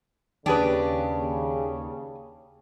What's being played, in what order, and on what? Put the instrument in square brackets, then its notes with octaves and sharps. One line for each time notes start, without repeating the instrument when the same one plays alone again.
[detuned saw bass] D#2 [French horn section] C#3 [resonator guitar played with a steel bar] D4 G#4 B4 [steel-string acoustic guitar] G4